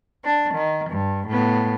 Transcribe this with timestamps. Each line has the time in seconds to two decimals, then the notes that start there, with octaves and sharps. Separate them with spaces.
0.24 D4
0.54 D#3
0.90 G2
1.28 A2 B3